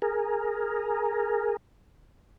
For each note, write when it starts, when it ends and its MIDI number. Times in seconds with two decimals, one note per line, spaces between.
0.02 1.57 68
0.02 1.57 70